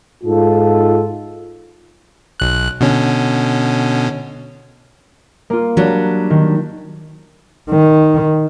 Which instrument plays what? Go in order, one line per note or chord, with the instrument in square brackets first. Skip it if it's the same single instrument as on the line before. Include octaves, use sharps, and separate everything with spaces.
[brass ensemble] G#2 F4 A4
[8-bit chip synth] B1 F#6
B2 D3 C#4
[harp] A#3 F4
[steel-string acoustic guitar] F#3 G3 D4
[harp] D#3
[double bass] D#3